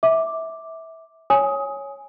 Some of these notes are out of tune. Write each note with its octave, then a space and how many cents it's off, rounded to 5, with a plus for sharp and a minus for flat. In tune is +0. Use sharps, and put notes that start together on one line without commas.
E5 -20 D6 +0
C#5 +0 G#5 +0 D#6 +20